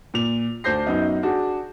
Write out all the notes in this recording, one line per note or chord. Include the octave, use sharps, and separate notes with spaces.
A#2 F7
D2 D4 C5 G6 A#6 C7
F#2 B3 D#4
D4 F#4 G#4